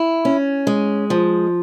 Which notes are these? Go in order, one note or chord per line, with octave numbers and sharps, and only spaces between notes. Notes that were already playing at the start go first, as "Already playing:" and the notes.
Already playing: E4
C#4
G#3
F3